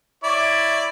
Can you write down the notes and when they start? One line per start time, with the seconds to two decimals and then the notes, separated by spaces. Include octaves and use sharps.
0.24 E4 C#5 D5